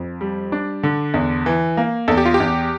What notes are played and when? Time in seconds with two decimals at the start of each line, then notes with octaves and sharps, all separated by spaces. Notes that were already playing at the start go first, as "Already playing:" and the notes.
Already playing: F2
0.21 G3
0.52 D4
0.83 D3
1.14 E2
1.46 E3
1.77 A#3
2.08 E2 A4
2.18 G4
2.26 F4
2.34 G4
2.40 E2